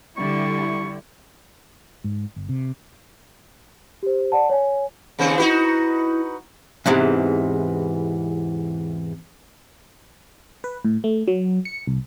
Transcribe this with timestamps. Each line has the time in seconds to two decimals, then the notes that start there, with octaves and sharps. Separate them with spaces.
0.17 D3 G3 E4 G4 C#6
2.04 G#2
2.36 G1
2.49 C3
4.03 G4 C5
4.32 D5 F#5 A5
4.50 C#5 G#5
5.19 D#2 C#3 C4
5.38 D#4 E4 F#4 B4
6.86 E2 G#2 C3 E3
10.64 B4
10.85 A2
11.04 A3
11.28 F#3
11.65 C#7
11.87 C2